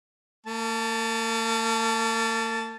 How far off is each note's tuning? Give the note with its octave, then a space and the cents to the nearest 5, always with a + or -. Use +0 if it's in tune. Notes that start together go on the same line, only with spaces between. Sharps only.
A#3 -40 A5 +0